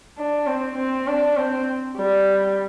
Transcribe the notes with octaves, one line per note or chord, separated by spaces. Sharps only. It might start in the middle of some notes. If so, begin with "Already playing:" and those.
D4
C4
C4
D4
C4
G3